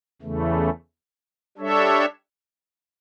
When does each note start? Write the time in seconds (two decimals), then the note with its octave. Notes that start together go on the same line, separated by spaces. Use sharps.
0.22 E2 C#3 E3 A3
1.57 G3 D4 A4 C#5 E5